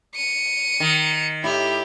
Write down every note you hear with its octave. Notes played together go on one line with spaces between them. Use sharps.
C#7 D#7
D#3
A2 E4 G4